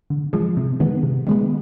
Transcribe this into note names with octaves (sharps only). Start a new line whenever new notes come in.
D3
F3 G#3
C3
D#3 G#3 B3
C3
D#3 G#3 B3